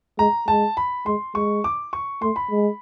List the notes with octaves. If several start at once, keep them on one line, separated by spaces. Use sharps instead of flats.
G#3 A#5
G#3 A5
B5
G#3 C6
G#3 C#6
D6
C#6
A3 C6
B5
G#3